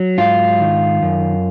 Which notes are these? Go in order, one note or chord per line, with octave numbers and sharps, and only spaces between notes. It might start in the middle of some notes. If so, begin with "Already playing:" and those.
Already playing: F#3
G#2 F4
D#3
F#2